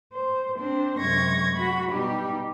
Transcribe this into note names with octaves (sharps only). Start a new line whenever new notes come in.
C5
C4 D4 C5
F#2 C3 G#3 C#6 G#6 A#6
F#4 B5
B2 G3 D#4 G4